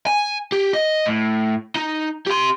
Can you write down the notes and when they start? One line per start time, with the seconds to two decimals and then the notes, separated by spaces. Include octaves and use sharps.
0.07 G#5
0.52 G4
0.73 D#5
1.06 A2
1.76 D#4
2.27 G4 C6